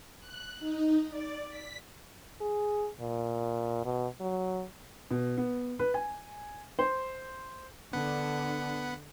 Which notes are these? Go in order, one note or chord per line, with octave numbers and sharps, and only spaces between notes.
F#6
D#4
D5
B6
G#4
A#2
B2
F#3
B2
B3
B4
G#5
C5
D3 B3 D4 F#5 B5